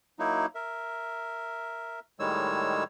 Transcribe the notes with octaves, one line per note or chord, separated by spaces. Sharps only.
F#3 A#3 D#4 E4
A#4 E5
A2 D#3 G3 G#3 C#5 E6